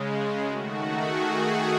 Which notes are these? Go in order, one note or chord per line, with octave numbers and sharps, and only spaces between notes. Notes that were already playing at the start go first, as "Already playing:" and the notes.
Already playing: C#3 G#3
D#3 A3 F#4
G#4